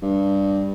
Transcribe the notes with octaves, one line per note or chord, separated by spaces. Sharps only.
G2